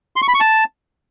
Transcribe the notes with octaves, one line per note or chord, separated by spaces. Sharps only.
C6
C#6
B5
C#6
A5